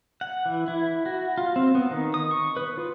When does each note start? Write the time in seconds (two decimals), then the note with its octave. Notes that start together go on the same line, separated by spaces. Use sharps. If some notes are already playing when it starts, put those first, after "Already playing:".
0.21 F#5
0.46 E3
0.68 E4
1.06 F#4
1.38 F4
1.56 C4
1.75 B3
1.91 D#3
2.14 D#6
2.31 C#6
2.57 B4
2.78 F4